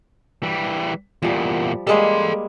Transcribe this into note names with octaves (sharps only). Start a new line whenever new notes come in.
E3 G3
E2 A#2 F3 G3
G3 G#3 A#3 A4 C6